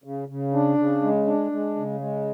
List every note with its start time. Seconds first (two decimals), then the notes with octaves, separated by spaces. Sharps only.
0.04 C#3
0.28 C#3
0.53 D4
0.78 C#3
1.02 G#3
1.27 D4
1.52 G#3
1.76 C#3
2.00 G#3